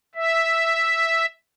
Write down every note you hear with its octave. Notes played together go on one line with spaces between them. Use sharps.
E5